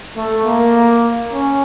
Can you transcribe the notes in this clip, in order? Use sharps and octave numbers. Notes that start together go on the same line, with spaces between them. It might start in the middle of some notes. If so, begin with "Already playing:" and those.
A3
A#3
C#4